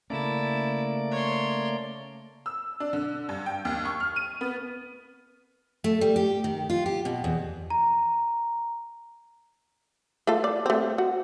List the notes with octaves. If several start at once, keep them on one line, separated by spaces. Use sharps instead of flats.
C#3 A3 A#3 C#4 E4 D5 A5
C#5 C6
E6
D4
D3
G2
G5
D#2
C#6
F6
D#7
B3
A3
G3
G4
D#3
F4
G4
B2
E2
A#5
A3 F4 A4
D5
A3 C4
F#4